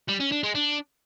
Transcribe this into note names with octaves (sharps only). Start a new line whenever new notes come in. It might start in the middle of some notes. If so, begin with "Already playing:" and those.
G3
C#4
D4
G#3
D4